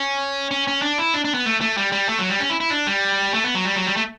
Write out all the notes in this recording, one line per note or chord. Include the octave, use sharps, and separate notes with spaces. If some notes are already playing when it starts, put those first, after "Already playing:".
Already playing: C#4
C#4
C#4
D4
E4
D4
D4
B3
A3
A3
G3
G3
A3
F#3
G3
C#4
E4
E4
D4
G3
A3
B3
F#3
G3
F#3
G3
A3